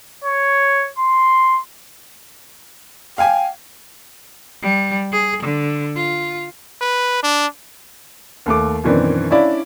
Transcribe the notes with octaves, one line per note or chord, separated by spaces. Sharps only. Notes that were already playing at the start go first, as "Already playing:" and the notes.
C#5
C6
F5 G5 G#5
G3
G#4
D3
F4
B4
D4
D#2 A3 D6
F#2 B2 D#3 E3 C4 D4
C#4 D4 E4 D5 F5 B5